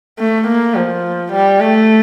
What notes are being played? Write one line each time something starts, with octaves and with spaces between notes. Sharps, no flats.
A3
A#3
F3
G3
A3